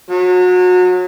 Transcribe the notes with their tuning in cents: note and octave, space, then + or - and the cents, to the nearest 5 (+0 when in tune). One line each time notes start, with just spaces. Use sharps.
F#3 -30